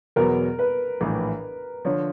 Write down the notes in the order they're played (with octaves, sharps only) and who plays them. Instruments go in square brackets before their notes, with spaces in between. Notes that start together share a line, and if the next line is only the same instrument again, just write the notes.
[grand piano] E2 B2 F#3 B3 [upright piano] A#4
[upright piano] B4
[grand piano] A#1 A2 E3
[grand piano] D3 F3 [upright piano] C#5